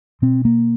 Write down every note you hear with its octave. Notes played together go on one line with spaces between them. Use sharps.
B2 C4
A#3